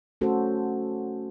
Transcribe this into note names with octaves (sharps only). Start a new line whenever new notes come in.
A3 C#4 F#4 A4 C5